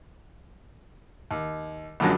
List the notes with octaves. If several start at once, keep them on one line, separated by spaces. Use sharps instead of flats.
D#2
A#1 F#2 D3 F3 F#3 G#3